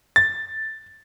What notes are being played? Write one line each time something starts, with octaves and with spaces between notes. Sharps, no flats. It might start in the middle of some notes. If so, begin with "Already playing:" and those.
A6